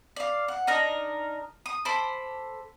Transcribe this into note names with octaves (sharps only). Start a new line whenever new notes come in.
D5 F5
F#5
D4 D#4 A#4 A#5
D#6
A4 C5 B5 D6